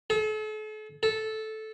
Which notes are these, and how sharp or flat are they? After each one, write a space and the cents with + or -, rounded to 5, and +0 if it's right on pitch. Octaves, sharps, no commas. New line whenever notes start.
A4 -40
A4 -10